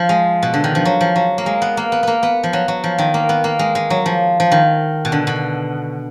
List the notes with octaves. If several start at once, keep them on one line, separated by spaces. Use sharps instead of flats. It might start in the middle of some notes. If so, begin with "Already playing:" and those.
Already playing: F3
G#3
B2
D3
D#3
F3
F#3
F3
F#3
A#3
G#3
B3
A#3
B3
A#3 B3
B3
F3
F#3
F#3
F3
D#3
A#3
B3
A#3
G#3
G#3
F#3
F3
F3
D#3
B2
D3
B2